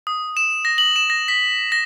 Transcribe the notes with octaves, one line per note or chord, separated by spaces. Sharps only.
D#6
E7
A#6
F#7
E7
A#6
B6
A#6